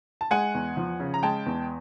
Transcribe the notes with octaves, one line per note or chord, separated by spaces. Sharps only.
A5
G#3 F#5 G#5
E2
F3
C#3
A#5
G#3 G5 A5
E2